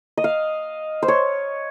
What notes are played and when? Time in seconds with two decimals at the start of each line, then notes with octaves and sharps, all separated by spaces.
0.17 D#5
0.24 F5
1.02 C5
1.08 C#5